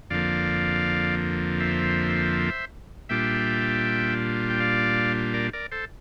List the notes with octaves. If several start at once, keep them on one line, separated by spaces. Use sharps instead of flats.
F2 D3 F3 A#3 D5 F5
C5 E5
A#2 G3 D4 F4 E5 G5
G5
D5 F5
A#4 D5
A#4 D5
A4 C5